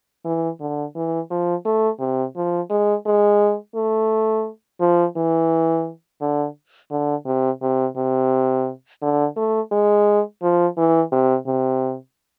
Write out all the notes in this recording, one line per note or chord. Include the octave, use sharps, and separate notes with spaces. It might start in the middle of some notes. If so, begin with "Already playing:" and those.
E3
D3
E3
F3
A3
C3
F3
G#3
G#3
A3
F3
E3
D3
D3
C3
C3
C3
D3
A3
G#3
F3
E3
C3
C3